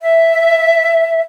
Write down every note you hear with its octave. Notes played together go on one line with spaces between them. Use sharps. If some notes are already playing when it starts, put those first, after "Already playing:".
E5